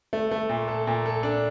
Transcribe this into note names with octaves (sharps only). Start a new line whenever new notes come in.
A3
A3
A#2
A4
A#2
A4
D4